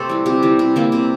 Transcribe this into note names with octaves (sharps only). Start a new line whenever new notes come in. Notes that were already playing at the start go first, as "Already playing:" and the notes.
Already playing: C3 A3 C4 G4 A4
E3 G3
C3 G4
E3 G3
C3
E3 A#3 E4
C3